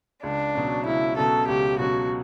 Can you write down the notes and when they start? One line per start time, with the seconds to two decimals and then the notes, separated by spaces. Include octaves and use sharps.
0.23 C#2 D4
0.55 B2 F#3 C#4
0.86 C#2 E4
1.17 B2 F#3 C#4 A4
1.48 C#2 G4
1.79 B2 F#3 C#4 F#4